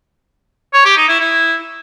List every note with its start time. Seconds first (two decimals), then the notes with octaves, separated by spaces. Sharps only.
0.73 C#5
0.85 G4
0.97 D#4
1.08 E4
1.20 E4